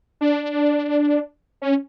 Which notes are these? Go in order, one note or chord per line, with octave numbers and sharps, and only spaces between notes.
D4
C#4